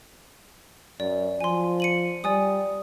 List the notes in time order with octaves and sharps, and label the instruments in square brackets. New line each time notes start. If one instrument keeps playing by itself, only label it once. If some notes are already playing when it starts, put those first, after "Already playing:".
[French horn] F#2 [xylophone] D5
[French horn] F3 [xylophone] G#5 C6
[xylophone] C#7 D#7 F#7
[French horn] G3 [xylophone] D5 G#5 D#6